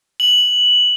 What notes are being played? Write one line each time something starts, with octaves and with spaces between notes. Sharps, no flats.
F#7